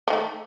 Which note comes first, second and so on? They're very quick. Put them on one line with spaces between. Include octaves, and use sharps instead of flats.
F3 D#3 A3